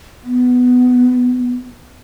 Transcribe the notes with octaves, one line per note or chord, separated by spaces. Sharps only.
B3